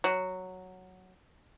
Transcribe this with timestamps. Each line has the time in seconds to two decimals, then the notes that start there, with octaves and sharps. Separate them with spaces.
0.04 F#3